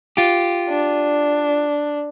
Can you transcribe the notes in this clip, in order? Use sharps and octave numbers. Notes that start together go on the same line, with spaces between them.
F4 G4
D4